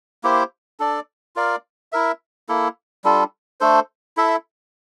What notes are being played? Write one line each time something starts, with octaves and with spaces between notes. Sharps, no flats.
A#3 E4 G4 C5
D4 A4 D5
F4 A#4 D5 F5
E4 A#4 E5
A#3 E4 A4
G3 D4 F4 A4
A3 D4 A4 C5
E4 A4 E5